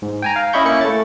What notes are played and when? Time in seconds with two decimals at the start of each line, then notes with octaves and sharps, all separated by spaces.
0.02 G#2
0.22 G5 G#5 A#5
0.36 F5
0.53 C#4 E4 D#5 B5 C#6 G6
0.65 A#3 C#4 E4 C#7
0.81 A3 A6